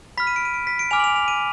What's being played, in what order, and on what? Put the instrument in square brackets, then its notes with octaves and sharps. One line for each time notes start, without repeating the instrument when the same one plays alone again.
[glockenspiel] B5 F6 B6
D#7
D7
D#7
D7
B6
D7
G#5 D6 F6 F7
F#7
F7
F7
D#7